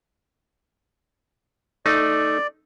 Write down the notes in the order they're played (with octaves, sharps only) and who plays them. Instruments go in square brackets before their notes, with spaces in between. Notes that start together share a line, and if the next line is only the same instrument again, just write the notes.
[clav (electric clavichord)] A3 D#4 [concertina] D5